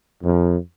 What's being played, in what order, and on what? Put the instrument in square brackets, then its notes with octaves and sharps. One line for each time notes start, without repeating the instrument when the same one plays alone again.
[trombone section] F2